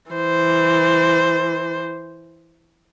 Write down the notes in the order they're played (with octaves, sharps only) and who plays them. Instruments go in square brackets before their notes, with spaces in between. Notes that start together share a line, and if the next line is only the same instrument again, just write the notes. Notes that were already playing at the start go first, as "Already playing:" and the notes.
[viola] E3 C5